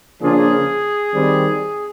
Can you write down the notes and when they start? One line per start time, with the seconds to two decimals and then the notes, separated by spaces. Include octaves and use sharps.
0.21 C#3 F3 A#3 D4 F4 G#4
1.13 D#3 G3 C4